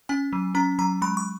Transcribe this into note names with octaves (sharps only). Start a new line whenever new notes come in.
C#4 G#5
F#3
C#4 A#5
F#3 A#5
G#3 B5
C#6